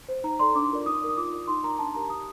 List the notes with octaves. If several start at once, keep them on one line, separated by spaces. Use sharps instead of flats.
C5
D#4 A#5
A4 D5 C6
D4 D6
F4 A#4 D5
D#4 D#6
A#4 D5
D#6
F4 D6
A#4 D5
D#4 C6
A#4 D5 A#5
D4 A5
G4 A#4 A#5
G4 D#6